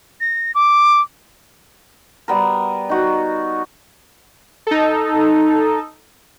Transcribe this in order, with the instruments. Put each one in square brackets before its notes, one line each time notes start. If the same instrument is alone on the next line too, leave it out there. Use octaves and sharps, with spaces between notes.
[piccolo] A#6
D6
[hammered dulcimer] G3 B3 A#4
D#4 F#4
[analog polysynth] D#4 A4